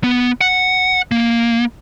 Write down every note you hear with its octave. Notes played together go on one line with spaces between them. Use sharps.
B3
F#5
A#3